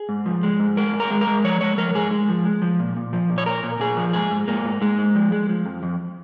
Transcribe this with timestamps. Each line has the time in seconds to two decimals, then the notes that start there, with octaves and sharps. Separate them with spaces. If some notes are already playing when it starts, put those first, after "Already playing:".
Already playing: G#4
0.09 G#2
0.26 F3
0.43 G#3
0.59 G#2
0.77 G#3 A#4
0.93 G#2
1.00 A#4
1.10 G#3
1.21 A#4
1.27 G#3
1.44 F3 C#5
1.61 G#3 C#5
1.78 F3 A#4
1.95 G#2 G#4
2.11 G#3
2.29 F3
2.45 G#3
2.62 F3
2.79 A#2
2.96 A#2
3.13 F3
3.30 A#2
3.38 C#5
3.46 A#2 A#4
3.64 A#2
3.80 A#2 G#4
3.97 F3
4.13 G#2 G#4
4.31 G#2
4.48 G#2 A#3
4.65 G#2
4.81 G#2 G#3
4.98 G#2
5.15 F3
5.32 G#3
5.49 F3
5.66 F2
5.83 F2